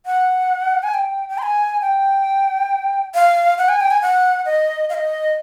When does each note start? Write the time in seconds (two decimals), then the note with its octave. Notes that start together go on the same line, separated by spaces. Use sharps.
0.06 F#5
0.83 G#5
0.94 G5
1.29 G5
1.38 C6
1.43 G#5
1.81 G5
3.14 F5
3.58 F#5
3.69 G#5
3.81 G5
3.91 G#5
4.02 F#5
4.45 D#5
4.89 F5
4.94 D#5